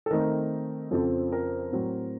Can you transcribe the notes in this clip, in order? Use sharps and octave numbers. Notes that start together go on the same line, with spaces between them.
A4
D#3 A3 C4 D#4 A#4
F2 C#3 F3 C4 A4
A#4
A2 F#3 C4